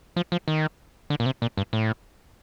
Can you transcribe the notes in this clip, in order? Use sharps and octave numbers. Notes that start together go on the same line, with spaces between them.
F3
F3
D#3
D3
A#2
C3
A#2
G2
A2